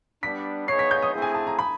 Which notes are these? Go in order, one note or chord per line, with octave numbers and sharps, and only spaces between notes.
G3 B3 D4 B6
B3 D#4 G#4 C#5 C7
B6
G6
D#6
A3 C4 E4 G#4
G#5
A5
A#5
B5